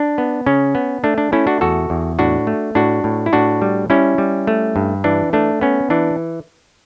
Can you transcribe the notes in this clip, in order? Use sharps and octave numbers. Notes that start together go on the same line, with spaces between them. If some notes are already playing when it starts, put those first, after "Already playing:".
Already playing: D4
B3
C#3 C#4
B3
A3 D4
D4
A3 C#4 E4
D4 F#4
E2 F#4 A4
E2
A2 D4 F#4
A3
A2 D4 F#4
A2
E4
A2 D4 F#4
G3
G3 C#4 E4
G3
A3
G2
E3 D4
A3 D4
B3 C#4
E3 D4